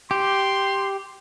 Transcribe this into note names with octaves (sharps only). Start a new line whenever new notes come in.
G4 C6